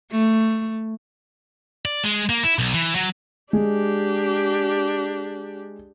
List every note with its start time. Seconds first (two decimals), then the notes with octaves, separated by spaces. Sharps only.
0.12 A3
1.85 D5
2.04 G#3
2.29 A#3
2.43 E4
2.59 B1
2.74 E3
2.95 F#3
3.53 G#3 D4 G4